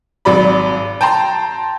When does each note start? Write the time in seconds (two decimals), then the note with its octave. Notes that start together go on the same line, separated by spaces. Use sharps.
0.25 G#1 F#3 D5 B5
1.01 G5 A5 A#5 C6